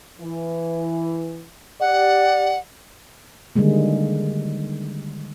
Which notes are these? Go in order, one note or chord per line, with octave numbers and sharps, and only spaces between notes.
E3
G4 D5 F#5
D3 D#3 G3 G#3 A#3